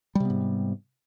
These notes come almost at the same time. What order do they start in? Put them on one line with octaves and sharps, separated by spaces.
G3 C3 B3 G#2